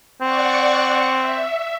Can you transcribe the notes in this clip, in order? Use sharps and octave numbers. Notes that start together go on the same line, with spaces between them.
C4 D5 F#5 C#6
E5